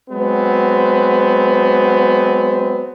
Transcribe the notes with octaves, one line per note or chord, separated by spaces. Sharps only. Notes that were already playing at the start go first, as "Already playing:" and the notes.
F#3 G#3 B3 C4